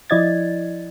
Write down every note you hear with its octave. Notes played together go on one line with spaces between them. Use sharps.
F3 E4 D5 D#5 G#6 A6